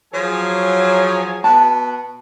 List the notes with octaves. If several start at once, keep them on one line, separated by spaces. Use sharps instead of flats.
F3 F#3 G#4 C#5 G#5
B2 A5